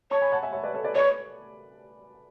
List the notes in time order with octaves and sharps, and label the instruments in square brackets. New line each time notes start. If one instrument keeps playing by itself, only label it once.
[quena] C#5 [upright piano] A5 C#6
[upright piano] G#5 B5
F#5 A5
E5 G#5
C#5 E5
B4 D5
A4 C#5
B4 D5
[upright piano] B4 D5 [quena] C#5